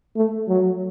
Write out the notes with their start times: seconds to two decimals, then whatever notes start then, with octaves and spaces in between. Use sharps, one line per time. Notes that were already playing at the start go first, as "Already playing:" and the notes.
0.16 A3
0.48 F#3